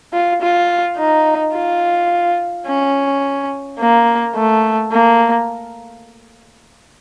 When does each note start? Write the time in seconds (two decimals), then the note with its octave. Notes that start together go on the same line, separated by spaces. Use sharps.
0.13 F4
0.42 F4
0.98 D#4
1.54 F4
2.67 C#4
3.79 A#3
4.36 A3
4.92 A#3